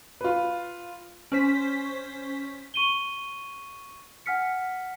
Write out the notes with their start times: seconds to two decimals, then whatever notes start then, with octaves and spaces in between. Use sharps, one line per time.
0.21 F4 B4
1.32 C#4 C5 B6
2.74 C#6 D#7 G7
4.26 F#5 G#5 F6 B6 C#7